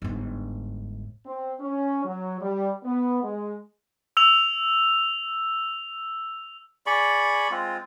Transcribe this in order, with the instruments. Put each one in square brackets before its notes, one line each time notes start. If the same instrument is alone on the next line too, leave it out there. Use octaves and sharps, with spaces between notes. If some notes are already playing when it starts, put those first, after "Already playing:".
[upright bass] G1 G#2
[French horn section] C4
C#4
F#3
G3
B3
G#3
[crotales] E6 F7
[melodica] G#4 D5 B5 C#6
G#3 C4 F4